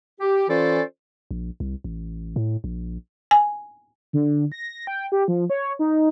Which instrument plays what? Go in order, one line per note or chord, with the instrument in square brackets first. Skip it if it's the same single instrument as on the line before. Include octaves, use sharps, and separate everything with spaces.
[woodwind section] G4
E3 C#4 F4 A4 C5 D5
[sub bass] A#1
C2
A1
A2
A#1
[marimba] G#5
[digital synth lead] D3
A#6
G5
G4
F3
C#5
D#4